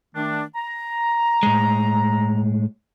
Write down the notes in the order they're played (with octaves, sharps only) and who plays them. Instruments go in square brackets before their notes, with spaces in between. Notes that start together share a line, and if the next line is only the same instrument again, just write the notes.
[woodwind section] D#3 A3 D4
A#5
[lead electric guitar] A2 G#3